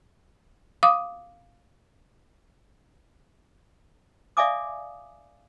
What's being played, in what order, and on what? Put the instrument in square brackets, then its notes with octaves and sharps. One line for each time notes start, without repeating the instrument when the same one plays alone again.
[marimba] F5 D6 D#6
[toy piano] D5 E5 F5 G#5 D6 D#6